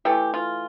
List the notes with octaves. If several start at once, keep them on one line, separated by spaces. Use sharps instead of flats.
E3 A3 G4
F4